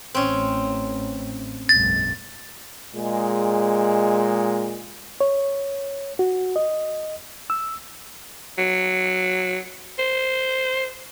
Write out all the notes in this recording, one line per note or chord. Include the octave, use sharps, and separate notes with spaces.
A1 C4 C#4
F#1 B1 G#2 A6
A#2 G#3
C#5
F#4
D#5
E6
F#3
C5